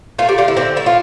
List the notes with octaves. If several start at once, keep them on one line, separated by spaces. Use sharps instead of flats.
A3 F4
G4
D3 F4
E4
D3 C4
A3 E4
F4